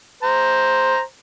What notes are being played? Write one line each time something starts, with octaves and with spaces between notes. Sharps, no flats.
C5 A#5